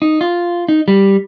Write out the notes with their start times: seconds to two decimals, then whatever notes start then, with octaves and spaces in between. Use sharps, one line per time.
0.02 D#4
0.21 F4
0.69 D#4
0.88 G3